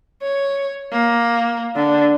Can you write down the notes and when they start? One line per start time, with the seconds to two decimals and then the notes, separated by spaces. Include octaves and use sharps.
0.22 C#5
0.93 A#3
1.76 D3